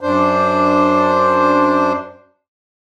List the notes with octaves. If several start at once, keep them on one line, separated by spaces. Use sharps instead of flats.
F#2 D4 C5